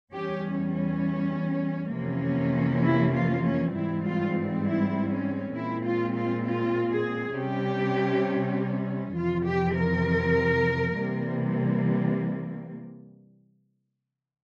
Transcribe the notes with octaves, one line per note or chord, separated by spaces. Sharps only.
E2 E3 G3 C#4 G4
C#4
F2 C3 E3 A#3 C#4
E4
F4
C#4
G#2 E3 G3 C4 E4
F4
E4
C#4
A#2 G#3 C4 E4
F4
F4
F4
G#4
C3 G3 C#4 G4
F2 C3 E3 F4
G4
A#4
C3 E3 G3 A#3